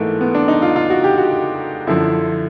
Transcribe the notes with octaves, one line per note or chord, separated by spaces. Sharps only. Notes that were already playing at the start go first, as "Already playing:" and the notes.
Already playing: G#2 E3 A3 A#3
B3
D4
D#4
F4
F4
F#4
G4
F#4
F#2 D3 F3 E4